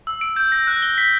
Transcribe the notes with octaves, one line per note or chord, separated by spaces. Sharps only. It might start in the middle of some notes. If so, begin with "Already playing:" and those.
E6
D7
G6
A#6
F#6
G7
B6